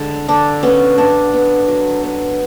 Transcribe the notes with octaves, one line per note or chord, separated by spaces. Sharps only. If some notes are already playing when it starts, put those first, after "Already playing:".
Already playing: D3 G#3
D3 D4
B3 C#4
B3 D4
B3
F#3
B3